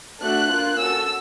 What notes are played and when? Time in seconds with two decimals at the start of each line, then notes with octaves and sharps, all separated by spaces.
0.21 A3 D4 F#4 A4 F#6
0.50 A#3 D4 F4
0.78 C#4 F#4 A4 E6